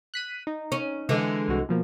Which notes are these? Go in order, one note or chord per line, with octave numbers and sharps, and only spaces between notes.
F#6 B6 D#7
D#4
C#4
D3 E3 G#3
C2 F#4
B2 F3 A#3